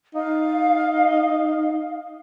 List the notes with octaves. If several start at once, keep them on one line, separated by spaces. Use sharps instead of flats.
D#4 F5